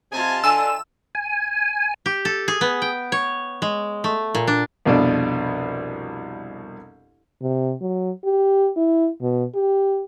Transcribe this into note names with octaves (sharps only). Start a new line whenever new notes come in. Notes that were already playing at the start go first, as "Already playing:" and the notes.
C3 F4 D#5 G#5 A5
D3 G#5 E6
G#5
G4
A4
G#4
B3
G5
C#5
G#3
A3
A#2
D4
C2 F2 B2 D4 D5
C3
F#3
G4
E4
B2
G4